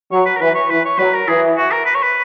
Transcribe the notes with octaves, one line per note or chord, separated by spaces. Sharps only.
F#3 C#5
B4
A#4
E3 B4
C#5
E3 B4
C#5
F#3 B4
A#4
E3 G#4
F#4
A#4
B4
C#5
B4